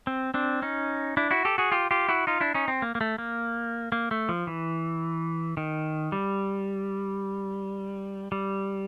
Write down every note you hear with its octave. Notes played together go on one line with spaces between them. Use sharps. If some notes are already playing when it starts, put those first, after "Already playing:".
C4
C4 D4
C#4 D#4
D4 E4
E4 F#4
G4 A4
F#4 G#4
F4 G4
F4 G4
E4 F#4
D#4 F4
D4 E4
C#4 D#4
C4
A#3
A#3
A3
A#3
A#3
A3
F3
E3
D#3
G3
G3